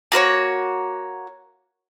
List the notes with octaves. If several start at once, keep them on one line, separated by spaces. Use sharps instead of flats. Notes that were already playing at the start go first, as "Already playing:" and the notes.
A#3 F#4 B4 C#5